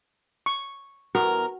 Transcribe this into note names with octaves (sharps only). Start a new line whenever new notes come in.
C#6
E2 F#4 A#4